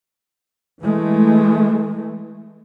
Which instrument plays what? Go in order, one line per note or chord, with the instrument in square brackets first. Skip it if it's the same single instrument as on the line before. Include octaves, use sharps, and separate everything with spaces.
[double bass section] E3 G#3 A3